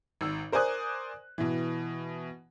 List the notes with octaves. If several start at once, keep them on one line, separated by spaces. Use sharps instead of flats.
G#1 E6
A#4 C5 D5 G#5 D#6 F#6
B2 E3